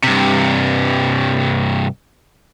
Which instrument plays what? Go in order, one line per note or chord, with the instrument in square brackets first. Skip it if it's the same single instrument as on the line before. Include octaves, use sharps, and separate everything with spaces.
[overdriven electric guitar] G2 C3